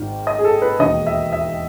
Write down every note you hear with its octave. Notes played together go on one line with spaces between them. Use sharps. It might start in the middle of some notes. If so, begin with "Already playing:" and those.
Already playing: G#1 G#2 D#3
D#5
G#4
A4
B4
E1 D#2 D#3 D#5
E5
E5